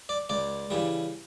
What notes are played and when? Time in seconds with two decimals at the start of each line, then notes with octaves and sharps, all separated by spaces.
0.09 D5
0.29 C#2 D5
0.70 C#3 E3 G3